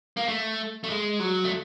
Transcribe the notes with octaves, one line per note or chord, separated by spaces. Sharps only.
A#3
A3
A3
G#3
F#3
A3